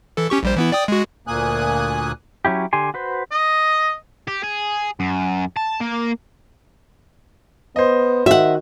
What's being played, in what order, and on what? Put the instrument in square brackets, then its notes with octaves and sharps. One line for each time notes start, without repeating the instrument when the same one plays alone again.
[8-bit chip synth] E3 A4
C#4 G4 C#6
A#1 G3 C5
E3 B3 E4
D5 G5 D#6
G#3 F#4
[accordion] D2 A#2 A#3 G#5 D#6 F#6
[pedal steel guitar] F#3 C#4 E4 G4
D3 G4 G#5 C6
F#4 B4 C5
[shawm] D#5
[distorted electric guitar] G4
G#4
F#2
A5
A#3
[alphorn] B3 [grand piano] C5 D#5
[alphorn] D#3 [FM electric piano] F#4 [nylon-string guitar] E5 F#5